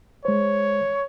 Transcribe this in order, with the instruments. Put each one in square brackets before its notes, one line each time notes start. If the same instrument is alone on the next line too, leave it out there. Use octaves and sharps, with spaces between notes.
[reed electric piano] G#3 C5 [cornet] C#5